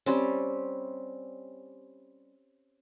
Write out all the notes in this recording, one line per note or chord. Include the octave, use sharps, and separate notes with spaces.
G3 C4 C#4